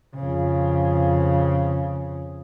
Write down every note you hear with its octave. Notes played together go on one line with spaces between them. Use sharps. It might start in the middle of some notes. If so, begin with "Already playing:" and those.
F2 C#3